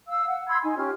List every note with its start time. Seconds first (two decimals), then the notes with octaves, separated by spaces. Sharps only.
0.08 F5 E6
0.28 F#5
0.49 B5 C6 E6 G#6
0.62 D#4 G#5
0.76 C#4 F4 G4 F6